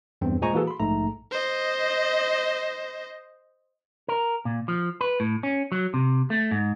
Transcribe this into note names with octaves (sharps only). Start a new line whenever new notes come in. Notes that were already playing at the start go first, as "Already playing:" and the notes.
E2 G2 C4
A#2 G#3 C5 G#5 A#5 C#6
E3 A#3 F#4 G#4 A4
B5 C6
A#1 G#2 A3 A#5
C5 D#5
A#4
A#2
F3
B4
A2
C#4
F#3
C3
A3
G#2